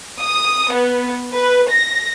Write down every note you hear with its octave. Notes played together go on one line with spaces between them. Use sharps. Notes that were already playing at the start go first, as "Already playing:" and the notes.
D#6
B3
B4
A#6